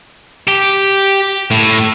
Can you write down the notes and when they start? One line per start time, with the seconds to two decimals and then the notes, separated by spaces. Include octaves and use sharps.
0.47 G4
1.51 A2